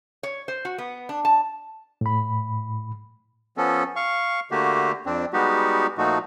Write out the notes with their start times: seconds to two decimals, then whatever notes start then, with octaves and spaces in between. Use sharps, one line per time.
0.23 C#5
0.48 C5
0.65 F#4
0.78 B3
1.09 D4
1.25 A5
2.01 A2 B5
3.57 F3 B3 C#4 A4
3.96 F5 C#6
4.51 D3 A3 A#3 F#4 G4
5.06 F2 C4 D4
5.33 G3 G#3 B3 D#4 F#4 G4
5.98 A#2 F3 A3 D#4 F#4